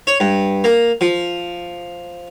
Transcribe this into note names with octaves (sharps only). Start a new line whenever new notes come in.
C#5
G2
A#3
F3